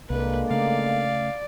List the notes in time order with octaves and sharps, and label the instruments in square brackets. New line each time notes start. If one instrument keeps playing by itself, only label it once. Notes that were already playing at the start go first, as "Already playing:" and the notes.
[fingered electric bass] C2 [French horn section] D3 G#3 A#3 [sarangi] B4
[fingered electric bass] C#3 A3 [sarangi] D5 [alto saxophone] F5